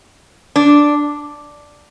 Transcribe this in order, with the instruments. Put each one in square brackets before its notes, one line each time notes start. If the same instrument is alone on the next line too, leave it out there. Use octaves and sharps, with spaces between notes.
[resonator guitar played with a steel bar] D4